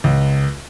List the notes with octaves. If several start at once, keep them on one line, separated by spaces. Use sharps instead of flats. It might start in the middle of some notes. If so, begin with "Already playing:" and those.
C#2